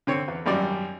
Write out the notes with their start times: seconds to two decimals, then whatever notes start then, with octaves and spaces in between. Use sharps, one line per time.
0.07 D3 C4 C#5
0.28 E2
0.46 G#1 F#2 G3 D5